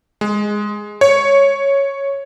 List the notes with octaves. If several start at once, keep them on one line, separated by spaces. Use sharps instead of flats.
G#3
C#5